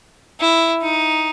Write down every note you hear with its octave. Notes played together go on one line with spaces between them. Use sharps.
E4
D#4